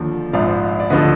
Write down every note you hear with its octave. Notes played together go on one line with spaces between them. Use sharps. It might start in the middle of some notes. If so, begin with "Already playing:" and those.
Already playing: D#2 D3 F3
A#1 G#2 F3 D5 F5
D5
D2 D3 F3 B4 D#5